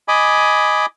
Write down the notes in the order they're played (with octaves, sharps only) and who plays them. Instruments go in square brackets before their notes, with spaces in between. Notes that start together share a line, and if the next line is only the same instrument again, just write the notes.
[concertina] D#5 G#5 B5 D6